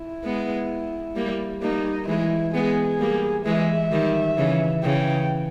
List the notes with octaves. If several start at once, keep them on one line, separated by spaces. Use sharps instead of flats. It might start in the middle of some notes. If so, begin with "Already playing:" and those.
Already playing: E4
G#3 B3
G3 A#3
G3 A#3 D#4
E3 G#3 E4
G#3 B3 G#4
G3 A#3
E3 G#3 E5
D#3 G3
C#3 E3
C#3 E3 G5